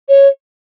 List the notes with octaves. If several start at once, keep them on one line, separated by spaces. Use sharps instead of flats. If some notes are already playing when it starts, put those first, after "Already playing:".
C#5